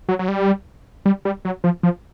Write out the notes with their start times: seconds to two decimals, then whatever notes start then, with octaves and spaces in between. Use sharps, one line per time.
0.09 F#3
0.19 F#3
0.28 G3
1.06 G3
1.25 G3
1.45 F#3
1.64 F3
1.83 F3